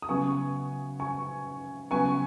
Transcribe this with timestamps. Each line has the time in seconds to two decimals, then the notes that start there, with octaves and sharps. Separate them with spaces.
0.02 D#6
0.09 C#3 F#3 B3 G#5 C#6
1.00 G#5 C#6
1.91 C#3 F#3 B3 G#5 C#6